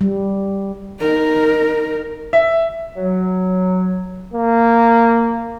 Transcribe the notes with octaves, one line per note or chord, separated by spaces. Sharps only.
G3
D#4 A#4
E5
F#3
A#3